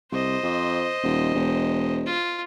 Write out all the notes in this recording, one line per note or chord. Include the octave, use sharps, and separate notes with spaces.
C2 C5 D#5
F2
D#1
E1
F4